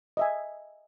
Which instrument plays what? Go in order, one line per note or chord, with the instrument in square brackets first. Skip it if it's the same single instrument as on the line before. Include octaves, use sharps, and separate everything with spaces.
[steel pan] D#5 E5 G#5